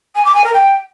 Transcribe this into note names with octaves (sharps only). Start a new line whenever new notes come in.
G#5
D6
G#5
A#4
G5